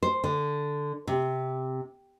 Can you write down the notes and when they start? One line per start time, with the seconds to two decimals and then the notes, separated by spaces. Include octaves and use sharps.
0.03 C5
0.24 D3
1.07 C3